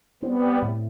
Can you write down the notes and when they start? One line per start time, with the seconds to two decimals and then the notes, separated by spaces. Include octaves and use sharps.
0.22 G3 B3 C4
0.62 A2